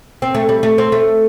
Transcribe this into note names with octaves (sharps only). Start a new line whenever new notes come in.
C4
A3
G3
A3
C4
A3